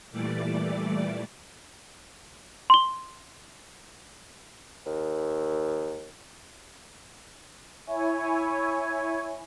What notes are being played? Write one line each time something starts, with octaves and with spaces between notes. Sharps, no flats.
A#2 E3 G3 A3 D5 D6
C6 G7
D#2
E4 C#5 G#5